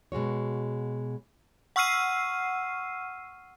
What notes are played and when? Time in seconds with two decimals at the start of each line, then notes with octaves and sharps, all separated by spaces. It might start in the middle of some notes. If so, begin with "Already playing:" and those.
0.12 B2 G#3 F#4 C#5
1.76 F#5 C#6 E6 F6 C7 D#7